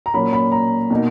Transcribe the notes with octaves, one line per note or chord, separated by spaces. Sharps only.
A#5
A#2 F#3 A#3 C#4 B5
B5
A#5
B2 A#3 D#4